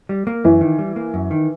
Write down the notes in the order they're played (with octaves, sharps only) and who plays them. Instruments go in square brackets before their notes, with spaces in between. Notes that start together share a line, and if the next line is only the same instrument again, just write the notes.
[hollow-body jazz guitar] G3
A#3
[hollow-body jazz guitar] F#2 [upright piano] E3
[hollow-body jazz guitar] D#3
G3
A#3
F#2
D#3